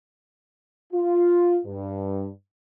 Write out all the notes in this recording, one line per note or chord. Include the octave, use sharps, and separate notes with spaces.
F4
G2